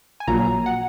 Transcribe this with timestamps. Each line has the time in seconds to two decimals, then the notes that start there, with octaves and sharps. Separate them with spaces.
0.20 G#5
0.27 A#1 A#2 F#3 A#3 A#5
0.66 F#5